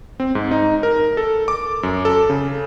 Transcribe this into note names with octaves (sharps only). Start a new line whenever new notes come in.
C4
G#2
D#4
A#4
A4
D6
F#2
A4
C#3